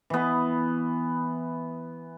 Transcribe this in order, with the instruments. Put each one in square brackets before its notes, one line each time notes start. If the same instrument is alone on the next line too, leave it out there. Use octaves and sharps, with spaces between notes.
[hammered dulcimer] E3 B3